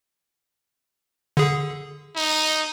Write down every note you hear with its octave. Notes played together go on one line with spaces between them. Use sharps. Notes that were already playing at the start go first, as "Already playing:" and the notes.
D3 G#4
D#4